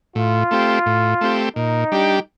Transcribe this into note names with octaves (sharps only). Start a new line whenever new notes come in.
A2 F4
A3 C4 G4
A2
A3 C4 G4
A#2 D#4
G3 D4 G4